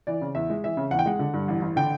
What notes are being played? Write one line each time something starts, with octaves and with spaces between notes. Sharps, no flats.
E3 D5
C#3
E2 E5
G#3
E3 E5
C#3
E2 F#5
G5
G#3 F#5
D3
G2
A1
A1
D3 G5